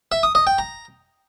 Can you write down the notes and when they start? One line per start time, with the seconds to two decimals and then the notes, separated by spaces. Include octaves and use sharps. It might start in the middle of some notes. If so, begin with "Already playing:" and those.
0.12 E5
0.23 D#6
0.35 D#5
0.47 G5
0.58 A#5